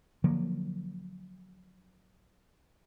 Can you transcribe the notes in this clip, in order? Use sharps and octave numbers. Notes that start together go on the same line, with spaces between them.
D3 F3 F#3 A#3